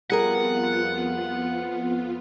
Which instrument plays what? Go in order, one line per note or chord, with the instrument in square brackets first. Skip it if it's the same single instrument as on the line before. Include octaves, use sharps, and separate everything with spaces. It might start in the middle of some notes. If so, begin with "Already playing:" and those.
[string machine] F2 B3 F4 [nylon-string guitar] G3 G#4 A#4 [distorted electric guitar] F#5